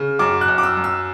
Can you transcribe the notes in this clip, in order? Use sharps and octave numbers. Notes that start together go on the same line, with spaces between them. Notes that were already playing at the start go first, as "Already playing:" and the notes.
Already playing: C#3
F#2 D6
F#6
F#2
D6
E6
F#2
E6